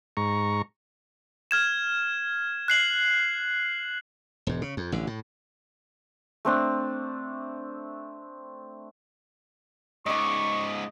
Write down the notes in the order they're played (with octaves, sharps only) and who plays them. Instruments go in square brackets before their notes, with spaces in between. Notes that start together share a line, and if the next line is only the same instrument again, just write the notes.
[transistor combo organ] G#2 A#5 C#6
[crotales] F6 G#6 E7
F#6 C7 F#7
[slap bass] E1 G#2
C#3
F2
A1 D3
A2
[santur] A3 C4 D4
[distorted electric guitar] G#2 C#3 [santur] D#5 D6 [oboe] C#6